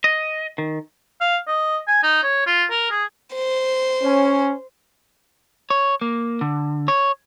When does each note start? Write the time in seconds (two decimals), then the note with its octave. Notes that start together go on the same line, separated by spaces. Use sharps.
0.04 D#5
0.58 D#3
1.21 F5
1.47 D#5
1.88 G#5
2.03 D#4
2.23 C#5
2.46 F4
2.70 A#4
2.91 G#4
3.34 C5
4.03 C#4
5.70 C#5
6.01 A#3
6.41 D3
6.88 C#5